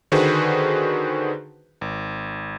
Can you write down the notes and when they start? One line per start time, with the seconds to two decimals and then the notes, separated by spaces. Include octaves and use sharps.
0.12 D3 D#3 F#4 G#4 B4 C5
1.81 G#1